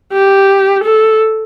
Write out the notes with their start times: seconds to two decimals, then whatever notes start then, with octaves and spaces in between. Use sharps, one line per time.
0.13 G4
0.84 A4